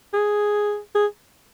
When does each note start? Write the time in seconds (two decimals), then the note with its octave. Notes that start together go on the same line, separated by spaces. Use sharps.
0.13 G#4
0.95 G#4